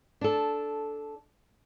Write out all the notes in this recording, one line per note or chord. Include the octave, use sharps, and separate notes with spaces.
D4 A4